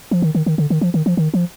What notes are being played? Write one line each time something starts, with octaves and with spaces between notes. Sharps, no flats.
F3
D#3
D#3
D#3
D3
D#3
F3
D#3
F3
D#3
F3